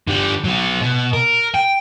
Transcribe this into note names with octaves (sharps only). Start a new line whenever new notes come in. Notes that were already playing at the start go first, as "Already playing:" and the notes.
D3 G3
F#3 B3
B2
A#4
G5